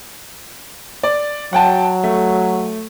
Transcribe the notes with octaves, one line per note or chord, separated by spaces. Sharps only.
D5
F#3 F#5 G5 A5
A3